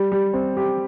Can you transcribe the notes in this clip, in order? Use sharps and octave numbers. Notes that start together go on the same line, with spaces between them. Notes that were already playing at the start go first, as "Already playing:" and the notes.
Already playing: G3
G3
C4
G4